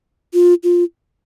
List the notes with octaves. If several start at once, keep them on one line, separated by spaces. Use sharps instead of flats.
F4
F4